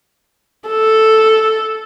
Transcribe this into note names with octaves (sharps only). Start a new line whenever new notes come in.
A4